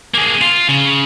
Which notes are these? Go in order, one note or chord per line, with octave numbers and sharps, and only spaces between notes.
A#3 G#4
F4
C#3